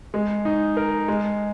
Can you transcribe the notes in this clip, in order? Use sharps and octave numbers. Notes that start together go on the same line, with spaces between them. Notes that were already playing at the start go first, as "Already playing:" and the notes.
G#3
D#4
A#4
G#3